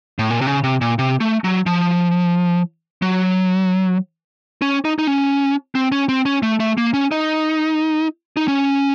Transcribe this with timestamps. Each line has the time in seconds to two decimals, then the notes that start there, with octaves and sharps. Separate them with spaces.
0.19 A2
0.30 A#2
0.41 C3
0.47 C#3
0.64 C3
0.81 A#2
0.99 C3
1.20 A3
1.44 F#3
1.66 F3
3.02 F#3
4.62 C#4
4.85 D#4
4.99 D#4
5.07 C#4
5.75 C4
5.92 C#4
6.09 C4
6.25 C#4
6.43 A3
6.60 A3
6.78 A#3
6.94 C#4
7.11 D#4
8.37 D#4
8.48 C#4